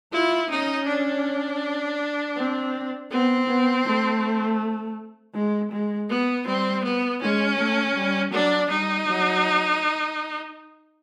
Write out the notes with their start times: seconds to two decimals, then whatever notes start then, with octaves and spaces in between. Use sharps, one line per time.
0.13 E4 F4
0.50 C#4 D#4
0.87 D4
2.36 C4
3.11 B3 C4
3.48 B3
3.86 A3
5.35 G#3
5.72 G#3
6.09 B3
6.46 G3 C4
6.84 B3
7.21 G#3 C#4
7.59 A3
7.96 G3
8.32 F#3 D4
8.70 G3 D#4
9.07 F#3